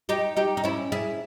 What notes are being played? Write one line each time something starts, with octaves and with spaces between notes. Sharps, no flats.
D#4 G4
D#4 G4
D#4
C#4 E4
E4 G#4